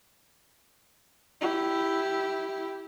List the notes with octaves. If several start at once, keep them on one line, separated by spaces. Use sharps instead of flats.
E4 G4